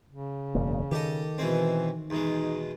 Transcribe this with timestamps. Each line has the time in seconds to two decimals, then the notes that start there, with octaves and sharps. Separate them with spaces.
0.09 C#3
0.55 E1 F#2 A#3
0.91 D#3 G4 A4 D#5
1.38 B2 E3 G#3 C4
2.10 E2 B2 G#3 D#4